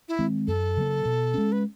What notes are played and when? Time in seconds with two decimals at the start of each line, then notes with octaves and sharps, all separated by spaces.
0.08 E4
0.19 D#3 G#3 C4
0.47 F#2 A4
0.77 C#3 F#3 A#3
1.05 B2
1.34 G#3 C#4
1.52 B4